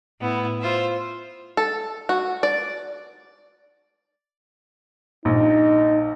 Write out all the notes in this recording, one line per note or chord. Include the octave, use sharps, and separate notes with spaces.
A2 B3 E4
F4 C5 E5
A4
F#4
D5
A#1 D#4